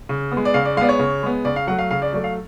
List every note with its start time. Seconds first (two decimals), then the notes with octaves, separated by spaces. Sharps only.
0.09 C#3
0.32 B3
0.37 G#3
0.45 D5
0.54 C#3 F5
0.65 D5
0.77 G#3 F5
0.81 B3 D5
0.89 C#5
0.99 C#3
1.23 G#3 B3
1.45 C#3 D5
1.56 F5
1.67 F#3 A3 F#5
1.79 F5
1.91 C#3 F5
2.02 D5
2.13 F#3 A3 D5
2.24 F5